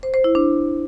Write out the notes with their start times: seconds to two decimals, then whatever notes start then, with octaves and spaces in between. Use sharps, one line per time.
0.03 C5
0.14 C5
0.24 E4
0.35 D4